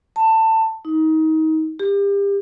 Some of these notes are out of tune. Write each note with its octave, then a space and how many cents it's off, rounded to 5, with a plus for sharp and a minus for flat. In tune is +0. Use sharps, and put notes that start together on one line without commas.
A5 +20
D#4 +25
G4 +35